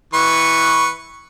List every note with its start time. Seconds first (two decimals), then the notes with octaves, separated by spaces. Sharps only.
0.14 E3 B4 C#6